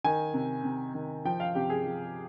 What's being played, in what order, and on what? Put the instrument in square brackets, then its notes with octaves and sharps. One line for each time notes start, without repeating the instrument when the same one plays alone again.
[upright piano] D#3 G#5
C3
C3
D#3
F3 G5
F5
C3 G4
G#4
F3